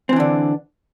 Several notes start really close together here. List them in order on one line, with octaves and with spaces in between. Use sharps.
C4 E3 D4 D3